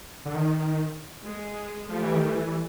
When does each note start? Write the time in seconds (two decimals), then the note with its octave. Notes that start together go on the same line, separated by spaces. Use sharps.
0.25 D3
0.35 D#3
1.23 G#3
1.89 F3 G3 A3
2.02 E3
2.15 D#3
2.28 E3